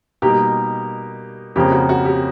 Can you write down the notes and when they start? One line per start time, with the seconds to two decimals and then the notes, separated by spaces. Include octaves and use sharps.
0.22 B2 G3 A#3 D#4 G4
1.56 F2 C#3 F3 A#3 G4
1.72 F#4
1.89 F#4
2.05 G4